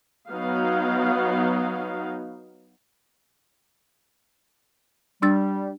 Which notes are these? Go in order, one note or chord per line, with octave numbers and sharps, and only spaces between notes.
F#3 B3 D#4 F5
G3 D4 E6 A6